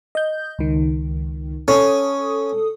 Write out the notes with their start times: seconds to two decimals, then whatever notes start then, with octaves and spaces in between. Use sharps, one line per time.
0.15 D#5 G6
0.59 C#2 D#3
1.68 C#4 A4 D#6